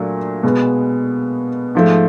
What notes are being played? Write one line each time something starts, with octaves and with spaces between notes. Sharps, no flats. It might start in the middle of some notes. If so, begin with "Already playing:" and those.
Already playing: A#2 F#3 A3 D4
B2 G#3 B3
G#2 F3 A3